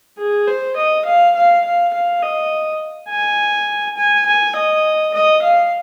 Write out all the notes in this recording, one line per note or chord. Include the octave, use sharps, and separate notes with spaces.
G#4
C5
D#5
F5
F5
F5
F5
D#5
G#5
G#5
G#5
D#5
D#5
F5